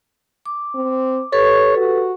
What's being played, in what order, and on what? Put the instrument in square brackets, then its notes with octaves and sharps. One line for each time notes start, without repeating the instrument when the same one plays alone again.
[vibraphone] D6
[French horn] C4
[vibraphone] G4 A4 B4 [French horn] C#5
[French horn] F#4